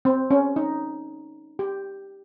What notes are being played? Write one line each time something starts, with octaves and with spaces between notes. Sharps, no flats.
C4
C#4
D#4
G4